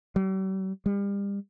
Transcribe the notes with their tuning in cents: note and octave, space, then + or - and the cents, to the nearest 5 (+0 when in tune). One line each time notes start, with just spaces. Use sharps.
G3 -45
G3 +35